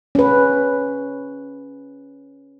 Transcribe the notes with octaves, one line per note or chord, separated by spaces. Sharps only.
C#4 B4